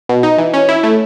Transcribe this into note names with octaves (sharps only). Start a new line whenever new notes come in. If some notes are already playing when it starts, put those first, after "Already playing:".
B2
D#4
E3
C#4
E4
A3